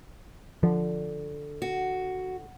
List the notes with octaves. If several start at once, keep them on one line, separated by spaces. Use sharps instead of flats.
D3 F3
F#4